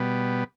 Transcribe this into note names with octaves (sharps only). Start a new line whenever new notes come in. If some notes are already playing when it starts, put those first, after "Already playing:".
Already playing: B2 G3 B3